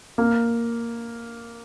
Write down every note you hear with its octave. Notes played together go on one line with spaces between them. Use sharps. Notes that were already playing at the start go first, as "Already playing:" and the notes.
A#3